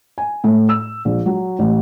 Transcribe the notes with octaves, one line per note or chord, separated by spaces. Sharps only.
G#5
A2
E6
A#1
F#3
A1